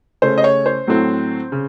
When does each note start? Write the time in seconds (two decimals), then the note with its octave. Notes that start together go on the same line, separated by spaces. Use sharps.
0.22 C#3 A3 C#4 C5
0.38 D#5
0.44 C#5
0.66 C5
0.87 A2 F#3 A3 C4
1.52 C#3